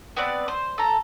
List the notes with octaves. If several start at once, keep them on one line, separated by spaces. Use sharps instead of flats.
B3 C4 B4 D5
C5
A4 A#5